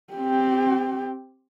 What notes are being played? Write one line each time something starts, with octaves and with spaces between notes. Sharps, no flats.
C4 G4